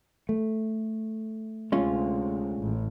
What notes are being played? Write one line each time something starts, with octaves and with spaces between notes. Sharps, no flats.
A3
D2 C3 G#3 C#4 F4
A1